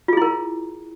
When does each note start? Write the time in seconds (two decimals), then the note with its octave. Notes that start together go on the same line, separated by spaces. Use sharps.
0.08 F4
0.13 G#4
0.17 E4
0.22 A#4